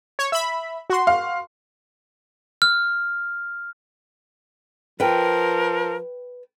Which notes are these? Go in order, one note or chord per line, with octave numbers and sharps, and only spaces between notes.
C#5
E5 B5
F#4 C6
F5
F6
F3 A#4 B4 G5